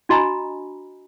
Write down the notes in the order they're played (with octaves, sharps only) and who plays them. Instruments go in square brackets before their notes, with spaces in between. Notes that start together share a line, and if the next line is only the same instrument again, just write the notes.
[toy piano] D4 F#4 D#5 G#5 A#5 B5